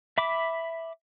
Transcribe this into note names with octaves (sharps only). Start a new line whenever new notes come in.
E5 B5 D6